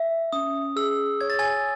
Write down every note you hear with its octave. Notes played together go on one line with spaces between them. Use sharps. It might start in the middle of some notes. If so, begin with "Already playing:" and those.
Already playing: E5
C#4 D#6
G#4 E6
C#5 G#6
A6
G#5 G#6